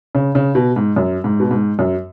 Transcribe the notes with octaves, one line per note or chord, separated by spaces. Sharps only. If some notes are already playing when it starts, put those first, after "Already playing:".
C#3
C#3
B2
G#2
F#2
G#2
B2
G#2
F#2